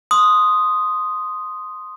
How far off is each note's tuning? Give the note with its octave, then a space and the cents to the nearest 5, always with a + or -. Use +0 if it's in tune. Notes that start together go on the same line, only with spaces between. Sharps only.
C6 +0 D#6 +0